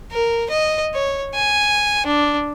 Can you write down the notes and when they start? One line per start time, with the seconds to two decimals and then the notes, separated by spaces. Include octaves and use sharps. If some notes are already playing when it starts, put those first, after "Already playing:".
0.12 A#4
0.50 D#5
0.94 C#5
1.35 G#5
2.06 D4